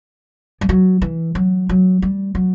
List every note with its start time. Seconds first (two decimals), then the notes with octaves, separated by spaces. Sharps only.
0.61 G3
0.69 F#3
1.02 E3
1.35 F#3
1.69 F#3
2.02 G3
2.35 F#3